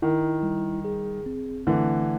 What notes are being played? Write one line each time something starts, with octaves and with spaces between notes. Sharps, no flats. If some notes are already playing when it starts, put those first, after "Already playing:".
D#3 E4
G3
G#4
C4
D3 E3 A3